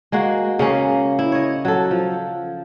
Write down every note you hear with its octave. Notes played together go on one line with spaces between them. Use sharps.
G#3 A#3 F#4
C#3 A#3 C#4
E4
C#5 D#5
F#3 A4
F3